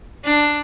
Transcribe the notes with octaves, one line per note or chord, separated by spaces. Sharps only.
D4